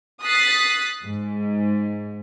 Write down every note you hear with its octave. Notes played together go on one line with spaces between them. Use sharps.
D#6 F#6 A6 B6 C7
G#2